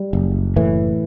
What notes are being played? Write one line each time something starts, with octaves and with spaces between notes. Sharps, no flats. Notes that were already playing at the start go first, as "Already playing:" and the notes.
Already playing: G3
F#1
A2 E3